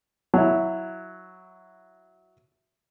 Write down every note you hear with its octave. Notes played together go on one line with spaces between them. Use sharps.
F#3 E4